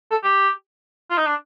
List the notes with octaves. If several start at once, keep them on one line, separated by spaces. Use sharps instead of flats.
A4
G4
F4
D#4
D4